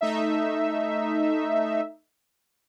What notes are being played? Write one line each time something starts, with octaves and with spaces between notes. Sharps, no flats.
A3 D#4 E5